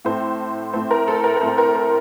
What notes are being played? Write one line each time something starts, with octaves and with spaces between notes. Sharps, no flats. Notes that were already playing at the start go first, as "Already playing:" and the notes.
A2 A3 C4 C5
A2 A3 C4 C5
A#4
A4
A#4
A#4
A2 A3 C4 C5
A#4
C5